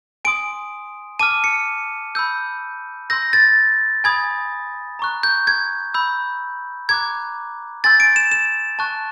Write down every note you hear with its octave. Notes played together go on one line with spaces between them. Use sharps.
G#5 C6 D#6 D7
A5 D6 F6 D#7
C#7
B5 E6 G6
C6 E6 G6 A#6
A6
G#5 B5 D#6 G#6
A#5 C#6 F#6
G6
G#6
B5 E6 G6
A#5 D6 F#6 G#6
G#5 C6 E6 G6 A6
D7
E7
E7
A5 C#6 F#6